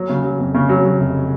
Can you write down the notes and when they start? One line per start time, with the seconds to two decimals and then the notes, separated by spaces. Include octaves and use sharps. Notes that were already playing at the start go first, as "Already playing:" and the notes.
Already playing: F#3
0.09 C#3
0.24 F#3
0.39 F2
0.55 C#3
0.69 F#3
0.85 F#3
1.00 F1